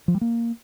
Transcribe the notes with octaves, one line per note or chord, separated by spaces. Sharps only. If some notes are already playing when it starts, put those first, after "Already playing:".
F3
G3
A#3